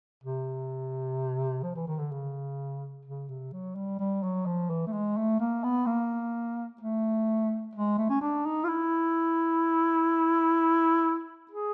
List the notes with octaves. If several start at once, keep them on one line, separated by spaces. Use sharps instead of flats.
C3
F3
E3
D#3
D3
C#3
C#3
C3
F#3
G3
G3
F#3
F3
E3
A3
G#3
A3
A#3
B3
A#3
A3
G#3
A3
C#4
D4
D#4
F4
E4
G#4